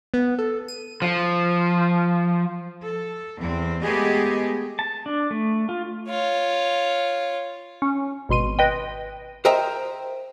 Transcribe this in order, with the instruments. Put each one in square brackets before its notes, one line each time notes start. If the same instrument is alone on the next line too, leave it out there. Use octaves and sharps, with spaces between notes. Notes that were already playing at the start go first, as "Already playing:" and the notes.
[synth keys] B3
A4
D#7
[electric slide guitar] F3
[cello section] A4
E2 C4
G#3 A3 B3 G4 G#4 D#5
[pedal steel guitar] A5
D4
A3
F4
[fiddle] F4 C#5
[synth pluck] C#4
G#1 B2 C6 D#7
B4 D#5 G5
[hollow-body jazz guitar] A#4 C5 D#5 E5 G5 A#5